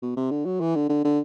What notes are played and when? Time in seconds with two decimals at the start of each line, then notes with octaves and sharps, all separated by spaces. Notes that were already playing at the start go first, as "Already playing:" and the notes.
0.03 B2
0.17 C3
0.31 D3
0.46 F#3
0.61 E3
0.76 D3
0.89 D3
1.05 D3